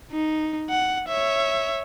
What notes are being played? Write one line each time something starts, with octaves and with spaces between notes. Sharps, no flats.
D#4
F#5
C#5 E5